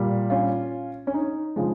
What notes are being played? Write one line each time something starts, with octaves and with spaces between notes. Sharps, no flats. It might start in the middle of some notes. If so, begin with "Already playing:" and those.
Already playing: A#2 G3
C#4 F4
C#4
D#4
C#3 F3 G#3